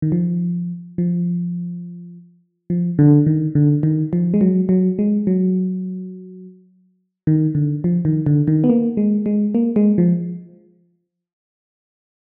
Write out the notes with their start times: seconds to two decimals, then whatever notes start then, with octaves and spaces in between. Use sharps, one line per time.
0.02 D#3
0.12 F3
0.98 F3
2.70 F3
2.99 D3
3.27 D#3
3.55 D3
3.83 D#3
4.13 F3
4.34 G#3
4.41 F#3
4.69 F#3
4.99 G#3
5.27 F#3
7.27 D#3
7.55 D3
7.84 F3
8.05 D#3
8.26 D3
8.48 D#3
8.64 B3
8.69 A#3
8.97 G#3
9.26 G#3
9.55 A#3
9.76 G#3
9.98 F3